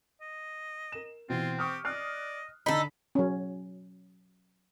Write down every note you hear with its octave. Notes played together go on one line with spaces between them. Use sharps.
D#5
A#4 E7
B2 E3 C4 F4
G4 C#6 D#6 F6
D5 D#5 F6 F#6 C7
D3 D4 D#4 A4 B5
F#3 C#4